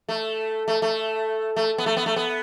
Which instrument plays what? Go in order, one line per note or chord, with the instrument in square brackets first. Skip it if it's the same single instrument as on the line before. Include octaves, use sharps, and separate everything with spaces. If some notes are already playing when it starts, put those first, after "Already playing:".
[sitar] A3
A3
A3
A3
B3
A3
B3
A3
B3